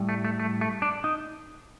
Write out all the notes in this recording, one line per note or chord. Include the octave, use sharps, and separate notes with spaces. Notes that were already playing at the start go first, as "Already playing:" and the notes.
Already playing: A2 G3
A3
A3
A3
A3
D4
D#4